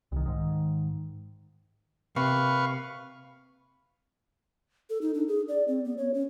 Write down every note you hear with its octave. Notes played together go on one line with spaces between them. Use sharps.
C2 D#3
G#2 D#3
C3 A#3 B4 F5 C#6
A4
D#4
D4
G#4
D5
C4
B3
C#5
C#4